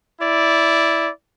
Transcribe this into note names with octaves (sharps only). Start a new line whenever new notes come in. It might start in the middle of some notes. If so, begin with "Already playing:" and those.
E4 D5